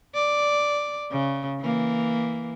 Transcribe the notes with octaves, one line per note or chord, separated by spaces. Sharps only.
D5
C#3
E3 A#3